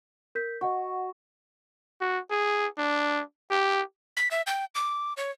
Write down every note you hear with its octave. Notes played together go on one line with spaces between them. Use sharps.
A#4 G6 B6
F#4 D#5 F#5 C#6
F#4
G#4
D4
G4
B6
E5
G5
D6
C#5